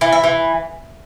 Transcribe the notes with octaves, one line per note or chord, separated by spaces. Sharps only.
E3
E4
E3